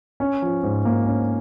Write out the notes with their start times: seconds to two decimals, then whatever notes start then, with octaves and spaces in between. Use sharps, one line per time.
0.20 C#4
0.42 F3
0.63 G#2
0.85 A#3
1.06 C#4